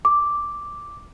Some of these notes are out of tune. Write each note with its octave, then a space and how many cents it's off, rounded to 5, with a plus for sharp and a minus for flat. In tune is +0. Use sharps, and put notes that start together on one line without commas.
D6 -5